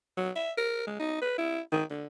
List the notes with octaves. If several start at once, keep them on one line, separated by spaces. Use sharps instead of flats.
F#3
E5
A#4
G#3
D#4
B4
E4
D#3
D3